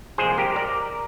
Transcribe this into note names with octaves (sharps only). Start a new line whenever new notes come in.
C2 A#2 F3 G#3 G#4 C5
G4 A#4
A#4 D5